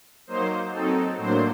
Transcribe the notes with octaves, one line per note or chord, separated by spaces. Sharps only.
F#3 A#3 D#4 C5
F#3 C4 D#4 A4
A2 F#3 A#3 D4 C5